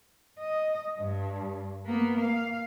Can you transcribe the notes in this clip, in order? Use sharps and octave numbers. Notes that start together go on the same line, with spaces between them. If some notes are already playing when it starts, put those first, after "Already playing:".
D#5
G2
A#3 B3
F5